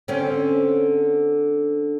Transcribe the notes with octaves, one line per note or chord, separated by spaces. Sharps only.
D3 C4 C#4